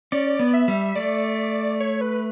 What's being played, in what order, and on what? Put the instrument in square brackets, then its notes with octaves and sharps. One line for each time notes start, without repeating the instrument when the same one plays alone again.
[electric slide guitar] C#4 [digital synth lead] D5
[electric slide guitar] B3
[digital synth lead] E5
[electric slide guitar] G3
[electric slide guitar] A3 [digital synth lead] D5
[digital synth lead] C#5
B4